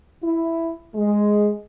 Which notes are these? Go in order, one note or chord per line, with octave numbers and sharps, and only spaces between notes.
E4
G#3